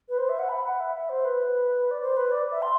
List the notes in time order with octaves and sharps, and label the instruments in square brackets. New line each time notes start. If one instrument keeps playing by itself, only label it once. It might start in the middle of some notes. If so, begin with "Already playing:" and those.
[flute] B4
C5
E5
F#5
B5
F#5
E5
E5
C5
B4
D5
C5
B4
D5
E5
C6